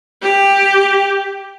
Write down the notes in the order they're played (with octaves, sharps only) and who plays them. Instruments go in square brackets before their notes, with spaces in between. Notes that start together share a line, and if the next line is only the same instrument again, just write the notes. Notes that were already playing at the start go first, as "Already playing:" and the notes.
[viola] G4